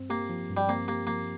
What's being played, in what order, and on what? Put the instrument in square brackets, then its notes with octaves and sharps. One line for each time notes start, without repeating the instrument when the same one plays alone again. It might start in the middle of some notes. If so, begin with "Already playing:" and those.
Already playing: [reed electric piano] G2 C4
[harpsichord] A#3 [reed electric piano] G4
[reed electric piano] F3
G2
[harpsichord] G3
[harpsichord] A#3 [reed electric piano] C4
[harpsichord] A#3 [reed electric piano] G4
[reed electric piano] F3 [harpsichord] A#3